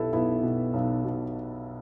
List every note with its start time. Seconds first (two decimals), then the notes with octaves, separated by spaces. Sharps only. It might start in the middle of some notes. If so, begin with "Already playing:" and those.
Already playing: B1 B2 E4 G4 A4 B4
0.12 B1 B3 E4
0.43 B2
0.74 B1
1.05 B2